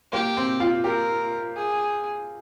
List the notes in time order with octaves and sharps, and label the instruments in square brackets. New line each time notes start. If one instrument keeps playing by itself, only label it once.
[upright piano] A#3 [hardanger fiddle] G4
[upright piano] C4
F4
[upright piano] G4 [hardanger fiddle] A#4
[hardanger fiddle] G#4